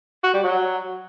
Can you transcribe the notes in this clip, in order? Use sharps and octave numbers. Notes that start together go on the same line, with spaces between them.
F#4
G3
F#3